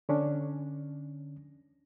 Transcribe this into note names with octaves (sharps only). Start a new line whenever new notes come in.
D3 C#4 D4